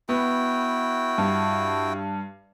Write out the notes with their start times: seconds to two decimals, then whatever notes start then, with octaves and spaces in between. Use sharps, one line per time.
0.09 B3 E4 F#4 G5
1.18 G2